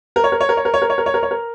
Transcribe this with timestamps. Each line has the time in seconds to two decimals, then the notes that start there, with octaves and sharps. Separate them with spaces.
0.16 A#4
0.24 C#5
0.32 A#4
0.40 C#5
0.49 A#4
0.57 C#5
0.65 A#4
0.74 C#5
0.82 A#4
0.90 C#5
0.98 A#4
1.06 C#5
1.14 A#4
1.23 C#5
1.31 A#4